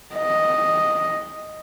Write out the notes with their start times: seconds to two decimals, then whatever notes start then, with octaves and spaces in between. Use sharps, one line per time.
0.15 D#5